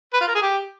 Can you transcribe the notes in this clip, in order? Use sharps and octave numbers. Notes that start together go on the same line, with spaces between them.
B4
F4
A#4
G#4
G4